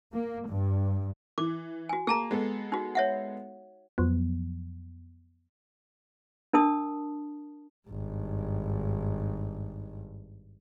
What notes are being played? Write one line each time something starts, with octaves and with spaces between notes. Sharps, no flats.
A#3
G2
E3 D6
F#4 G#5
A#3 G#4 A5 A#5
G#3 B3 A4
D#4 F#4
C#5 E5 F#5
F2 F3 F#3 B3
D4 A#4 A5 D#6
G#1 G2